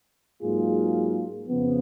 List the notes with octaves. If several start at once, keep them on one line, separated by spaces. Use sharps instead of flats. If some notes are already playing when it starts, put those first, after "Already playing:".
G#2 F#3 A#3 F4 G#4
F2 C#3 F3 B3